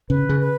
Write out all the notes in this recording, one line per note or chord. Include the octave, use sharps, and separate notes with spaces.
C#3 B4
C#3
B4